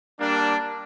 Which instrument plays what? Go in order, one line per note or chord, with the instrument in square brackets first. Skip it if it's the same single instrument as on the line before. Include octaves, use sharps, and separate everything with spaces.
[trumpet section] G3 A#3 D4